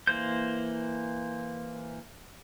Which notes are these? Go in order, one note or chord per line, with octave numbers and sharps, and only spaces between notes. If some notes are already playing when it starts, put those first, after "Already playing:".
E3 A#3 C5 G6